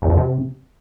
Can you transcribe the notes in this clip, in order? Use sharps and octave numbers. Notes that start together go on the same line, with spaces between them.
E2
F2
C3